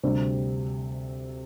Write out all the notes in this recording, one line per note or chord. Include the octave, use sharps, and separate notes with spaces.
D2 C3 G3 C4